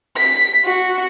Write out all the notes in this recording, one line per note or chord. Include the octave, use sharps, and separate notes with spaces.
B6
F#4